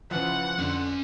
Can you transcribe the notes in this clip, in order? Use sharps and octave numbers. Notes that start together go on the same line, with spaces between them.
C#3 E3 F3 F#5
F2 D3 C#4 C6